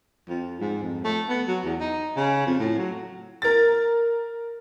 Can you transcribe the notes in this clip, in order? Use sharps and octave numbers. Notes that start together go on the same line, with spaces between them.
F2
G#2
F2
A3
B3
F#3
E2
D#4
C#3
F2
A2
F#3
A#4 A6